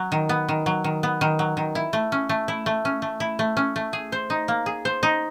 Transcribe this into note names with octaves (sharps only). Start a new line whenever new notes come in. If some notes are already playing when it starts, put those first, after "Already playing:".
Already playing: F#3
D#3
B3
D#3
F#3
D#3
B3
D#3
F#3
D#3
E4
A3
C#4
A3
E4
A3
C#4
A3
E4
A3
C#4
A3
G#4
C5
D#4
A#3
G#4
C5
D#4